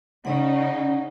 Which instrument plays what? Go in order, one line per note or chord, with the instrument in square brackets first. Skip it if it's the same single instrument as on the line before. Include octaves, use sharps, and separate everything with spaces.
[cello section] C#3 D#4 [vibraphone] C#4 D5 F#5